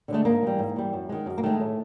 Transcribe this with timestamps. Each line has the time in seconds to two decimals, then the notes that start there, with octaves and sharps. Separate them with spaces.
0.08 D3 F3
0.13 G#3 A3
0.25 G#2 A#3
0.43 E3 G3
0.59 G#2
0.76 E3 G3
0.93 F#2
1.09 D#3 G#3
1.26 F#2
1.38 A#3
1.43 D#3 G#3 A3
1.60 A2